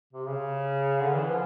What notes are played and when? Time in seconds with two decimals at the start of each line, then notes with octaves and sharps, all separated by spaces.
0.13 C3
0.28 C#3
1.01 D3
1.14 E3
1.29 F3